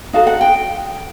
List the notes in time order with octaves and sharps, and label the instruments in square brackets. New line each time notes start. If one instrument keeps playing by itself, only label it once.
[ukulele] D#4 F#4 A4 F5
F#5
G5